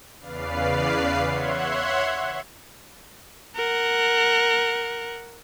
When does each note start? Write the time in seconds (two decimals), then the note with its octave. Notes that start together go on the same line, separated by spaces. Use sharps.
0.19 E2 C#3 B4 D5 F5 C7
1.23 C#5 E5 F#5 C6 F#6 G#6
3.56 A#4 F#5